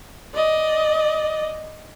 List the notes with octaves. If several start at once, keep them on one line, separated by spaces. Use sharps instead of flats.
D5 D#5